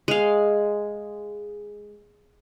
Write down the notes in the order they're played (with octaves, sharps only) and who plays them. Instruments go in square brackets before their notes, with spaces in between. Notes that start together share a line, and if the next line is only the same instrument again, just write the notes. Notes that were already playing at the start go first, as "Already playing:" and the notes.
[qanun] G#3 F5